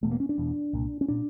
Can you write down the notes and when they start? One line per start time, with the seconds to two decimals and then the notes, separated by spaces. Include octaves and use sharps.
0.03 E1 E2 B2 A3
0.11 A#3
0.20 C#4
0.29 D4
0.37 E1 E2 B2
0.73 C2 A#2
1.01 C#4
1.08 A#2 D4